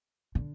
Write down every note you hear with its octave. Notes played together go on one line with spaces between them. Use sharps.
D3